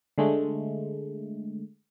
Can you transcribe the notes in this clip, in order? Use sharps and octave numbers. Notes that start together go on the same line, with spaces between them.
D3 G#3 A3